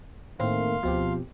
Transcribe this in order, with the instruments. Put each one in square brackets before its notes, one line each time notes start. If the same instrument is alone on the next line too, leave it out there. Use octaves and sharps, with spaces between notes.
[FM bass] A2 [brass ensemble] D#3 A3 A#3 [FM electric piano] C4 [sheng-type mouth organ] F5 C6
[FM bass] D2 [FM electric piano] B2 C4 G4 [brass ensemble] F3